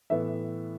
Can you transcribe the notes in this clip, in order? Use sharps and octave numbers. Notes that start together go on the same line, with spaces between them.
A2 E3 B3 E5